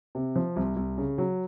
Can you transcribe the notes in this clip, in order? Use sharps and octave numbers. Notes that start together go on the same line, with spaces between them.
C3
F3
C2
C2
C#3
F#3